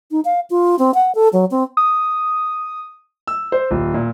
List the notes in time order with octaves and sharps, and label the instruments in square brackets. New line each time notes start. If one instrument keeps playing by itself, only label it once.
[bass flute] D#4
F5
F4
C4
F#5
A4
F#3
C4
[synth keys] D#6
[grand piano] E6
C5
D#1
A#2